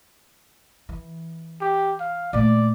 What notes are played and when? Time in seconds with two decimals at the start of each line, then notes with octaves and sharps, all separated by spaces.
0.89 E3
1.61 G4
2.00 F5
2.33 A#2 A3 D5